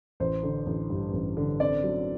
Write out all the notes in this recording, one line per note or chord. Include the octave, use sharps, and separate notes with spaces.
A1 C5
D3
A1
G2
A1
D3
C4 D5
F#3